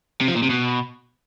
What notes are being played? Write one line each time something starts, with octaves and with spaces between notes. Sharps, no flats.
C3
F3
A#2
C3
B2